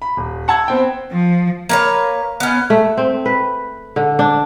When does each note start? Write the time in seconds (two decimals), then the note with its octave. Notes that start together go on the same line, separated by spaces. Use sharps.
0.02 B5
0.17 D#1
0.48 F#5 A5 E6 G#6
0.68 B3 C4 G5
1.11 F3
1.69 A#3 B4 C#5
2.40 B3 C#4
2.70 A3
2.97 C4
3.26 B4
3.96 D3
4.19 D4